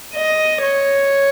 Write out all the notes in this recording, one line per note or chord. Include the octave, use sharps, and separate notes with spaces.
D#5
C#5